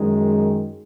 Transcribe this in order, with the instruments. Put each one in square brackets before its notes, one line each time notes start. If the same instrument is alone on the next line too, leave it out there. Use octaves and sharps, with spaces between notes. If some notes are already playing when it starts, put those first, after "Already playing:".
Already playing: [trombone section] F#2 D#3 G#3